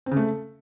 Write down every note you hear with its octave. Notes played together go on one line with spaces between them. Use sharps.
C4
C#3
A3